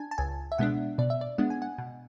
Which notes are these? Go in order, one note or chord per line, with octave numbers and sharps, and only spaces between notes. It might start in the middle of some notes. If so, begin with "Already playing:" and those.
Already playing: D4 G#5 A5
A5
C#2 G#5
E5
B2 G#3 B3 D4 F#5
B2 D5
E5
D5
G#3 B3 D4 F#5
G#5
F#5
B2